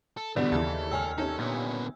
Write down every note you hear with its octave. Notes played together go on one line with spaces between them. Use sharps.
A4
B2 D3 E3 G3 B3 G4 D5
D#2 C#3 E3 A4
C#2 C#5 G#5 E6 F6
C3 C#4 D#4 A4
A#2 D3 B3